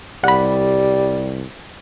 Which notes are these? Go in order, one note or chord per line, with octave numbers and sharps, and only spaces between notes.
C2 G3 F#5 B5